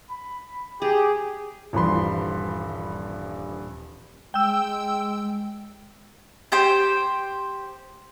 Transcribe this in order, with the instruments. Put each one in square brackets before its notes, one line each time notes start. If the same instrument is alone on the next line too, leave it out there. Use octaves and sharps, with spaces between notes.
[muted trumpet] B5
[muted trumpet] G4 [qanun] G#4
[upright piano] D#1 G2 E3 F3 B5 C6
[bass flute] G#3 [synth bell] G5 E6
[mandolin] G4 C5 G5